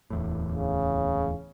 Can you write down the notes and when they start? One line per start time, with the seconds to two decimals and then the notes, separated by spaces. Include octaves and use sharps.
0.10 D1 E2 A2
0.52 C#3